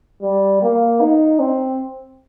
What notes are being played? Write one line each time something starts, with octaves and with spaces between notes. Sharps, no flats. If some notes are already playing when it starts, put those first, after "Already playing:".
G3
A#3
D#4
C4